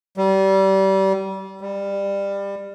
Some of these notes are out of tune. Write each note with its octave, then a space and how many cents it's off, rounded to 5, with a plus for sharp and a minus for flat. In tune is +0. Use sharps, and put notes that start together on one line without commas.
G3 -25
G3 +20